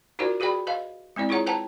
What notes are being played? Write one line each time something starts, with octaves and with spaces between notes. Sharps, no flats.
D#4 F4 F#4 A#4 C5 D5
F#4 G#4 B4 D5 G5 B5
B4 D#5 F5
G#3 C4 E4 D5
E4 F4 G#4 C#5 F#5 A#5
B4 C5 F#5 G5 A5 A#5